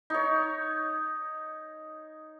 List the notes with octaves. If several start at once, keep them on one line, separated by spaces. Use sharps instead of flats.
D#4 C#5